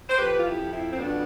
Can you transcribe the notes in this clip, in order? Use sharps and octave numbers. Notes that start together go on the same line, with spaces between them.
C5
F2 G4 B4
F4
E4 G4
F2
C4 E4
C4
B2 B3 D4